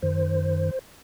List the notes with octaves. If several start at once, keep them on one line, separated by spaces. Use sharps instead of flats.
F#2 D#3 C5